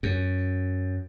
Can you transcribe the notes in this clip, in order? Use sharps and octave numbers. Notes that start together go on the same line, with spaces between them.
F#2